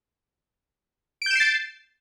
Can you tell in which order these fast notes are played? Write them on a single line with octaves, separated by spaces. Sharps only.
D7 G6 E7 C7 A6